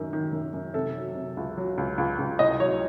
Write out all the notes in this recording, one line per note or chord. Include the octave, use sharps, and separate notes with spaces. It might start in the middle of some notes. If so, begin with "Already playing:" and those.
Already playing: F#2 D#3
D#3
F#2
F#2
C3 A4
F#3
C3
C#2
F#3
C#2
C#2
C#2
C2 D#5
F#3 C#5